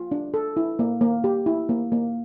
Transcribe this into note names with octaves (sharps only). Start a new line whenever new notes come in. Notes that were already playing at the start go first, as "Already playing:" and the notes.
Already playing: F4
D4
A4
E4
A#3
A#3
G4
E4
A#3
A#3